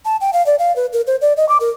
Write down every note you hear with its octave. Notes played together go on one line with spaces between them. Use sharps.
A5
G5
F5
D5
F5
B4
A#4
C5
D5
D#5
D6
A#4